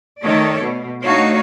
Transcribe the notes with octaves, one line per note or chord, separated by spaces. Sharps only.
D#3 A3 A4 C#5 D5
B2
A3 D4 D#4 F#4 C#5 F5